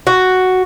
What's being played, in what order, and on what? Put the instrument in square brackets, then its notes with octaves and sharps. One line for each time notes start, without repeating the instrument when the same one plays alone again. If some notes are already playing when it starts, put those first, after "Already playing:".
[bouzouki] F#4